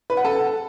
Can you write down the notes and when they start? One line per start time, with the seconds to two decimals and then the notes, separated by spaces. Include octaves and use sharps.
0.10 B4
0.17 F#5
0.25 A4